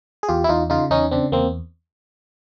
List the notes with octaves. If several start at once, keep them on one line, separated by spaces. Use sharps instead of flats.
G#4
E2 F4 G4
E4
E2 D#4 F4
C#3 D#4 F4
E2 C#4 D#4
C#3 C4 D4
E2 A#3 C4